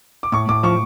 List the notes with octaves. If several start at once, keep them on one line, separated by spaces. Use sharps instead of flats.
D6
A2 C#6
A2 D6
F3 C#6